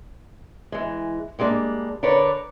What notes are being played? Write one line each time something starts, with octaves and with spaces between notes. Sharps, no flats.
E3 G#3
G3 G#3 A#3 D4
D3 A#4 B4 C#5 D5